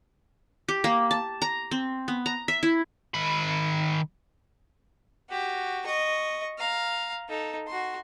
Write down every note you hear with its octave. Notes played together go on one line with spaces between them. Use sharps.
G4
A#3
A5
A#5
C4
B3
A#5
E5
E4
D#3 B5
F#4 G4
D#5 C#6
F5 A#5
D#4 A4
F#4 C6